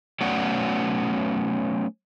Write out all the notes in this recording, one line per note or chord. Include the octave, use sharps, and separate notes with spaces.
F#3 A3 B3 C#4 D5 F#5